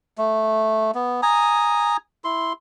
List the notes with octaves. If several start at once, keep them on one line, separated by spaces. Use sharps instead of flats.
A3
B3
G#5 A#5 D#6
E4 C6